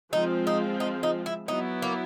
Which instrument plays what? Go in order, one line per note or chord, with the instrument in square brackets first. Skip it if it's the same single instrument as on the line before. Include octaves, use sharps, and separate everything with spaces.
[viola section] F3 G#3 C4 F4 [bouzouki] D#4
[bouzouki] D#4
D#4
D#4
E4
[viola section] F#3 B3 E4 [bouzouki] D#4
[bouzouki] A#3